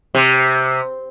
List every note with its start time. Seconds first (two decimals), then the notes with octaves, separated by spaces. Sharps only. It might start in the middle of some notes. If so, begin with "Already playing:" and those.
0.15 C3